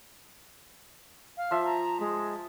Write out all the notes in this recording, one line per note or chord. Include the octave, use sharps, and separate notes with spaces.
F5
F3 E5
A#5
G#3